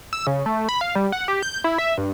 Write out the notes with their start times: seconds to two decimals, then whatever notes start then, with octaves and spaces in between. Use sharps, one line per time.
0.13 E6
0.27 C#3
0.46 A3
0.69 B5
0.81 F5
0.95 G3
1.12 F#5
1.28 G4
1.42 G6
1.64 E4
1.78 E5
1.98 G2